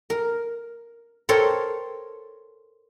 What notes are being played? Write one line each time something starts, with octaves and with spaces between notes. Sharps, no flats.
A#4
A4 A#4 C5 C#5 G5